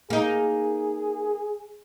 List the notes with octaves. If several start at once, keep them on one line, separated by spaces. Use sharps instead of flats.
A#3 D#4 G#4